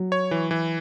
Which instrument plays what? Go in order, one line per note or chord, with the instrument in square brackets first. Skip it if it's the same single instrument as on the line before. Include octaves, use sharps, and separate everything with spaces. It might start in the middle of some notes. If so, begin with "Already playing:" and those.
Already playing: [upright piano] F#3
[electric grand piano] C#5
E3
E3